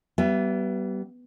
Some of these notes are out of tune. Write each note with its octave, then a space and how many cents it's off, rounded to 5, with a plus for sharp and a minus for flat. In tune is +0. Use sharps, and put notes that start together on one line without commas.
G3 -25 B3 +0 E5 +25